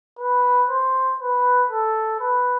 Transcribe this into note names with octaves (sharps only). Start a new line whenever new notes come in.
B4
C5
B4
A4
B4